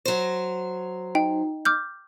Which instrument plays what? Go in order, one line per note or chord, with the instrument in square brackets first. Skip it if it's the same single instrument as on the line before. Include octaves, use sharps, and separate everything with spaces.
[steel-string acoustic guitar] F#3 C5
[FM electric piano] D#4 [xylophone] G5
[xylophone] D6 F6 G6